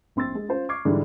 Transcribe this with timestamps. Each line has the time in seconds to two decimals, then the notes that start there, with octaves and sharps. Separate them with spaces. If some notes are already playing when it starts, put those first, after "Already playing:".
0.16 A#1 C4 C6 E6 A6
0.35 G#3
0.48 C#4 F4 C5
0.69 C#6 D6 F6 G#6 C7
0.85 G#2 D3 E3 G3 G#3